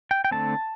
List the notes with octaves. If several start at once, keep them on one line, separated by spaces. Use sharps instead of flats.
G5
G5
D3 A3 C4 A5